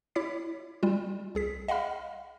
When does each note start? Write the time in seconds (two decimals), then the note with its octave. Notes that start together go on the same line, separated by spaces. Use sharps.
0.15 E4 C#5 D6 B6
0.83 G3 F4
1.35 C2 G#4 B6
1.68 D#5 F5 F#5 B5 F6